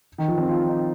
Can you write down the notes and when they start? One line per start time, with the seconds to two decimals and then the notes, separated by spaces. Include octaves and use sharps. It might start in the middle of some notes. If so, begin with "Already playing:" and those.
0.18 D#3
0.28 F3
0.38 C4
0.48 F4
0.68 D#4